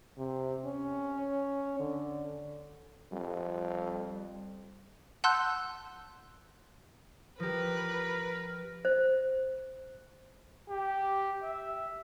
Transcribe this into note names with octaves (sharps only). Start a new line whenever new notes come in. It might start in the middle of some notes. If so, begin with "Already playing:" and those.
C3
C#4
D3
F2 G3
F#5 A5 C6 E6 F#6 G6
F3 G4 A#4 B4
C5
G4
E5